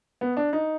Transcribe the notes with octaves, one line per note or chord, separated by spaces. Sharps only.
B3
D4
D#4